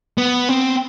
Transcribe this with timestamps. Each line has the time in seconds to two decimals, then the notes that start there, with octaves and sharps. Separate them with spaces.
0.18 B3
0.49 C4